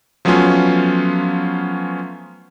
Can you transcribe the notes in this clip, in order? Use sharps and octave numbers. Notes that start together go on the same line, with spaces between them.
F3 F#3 A3 B3 C#4 F4